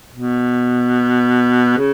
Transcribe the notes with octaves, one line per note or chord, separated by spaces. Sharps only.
B2
C#3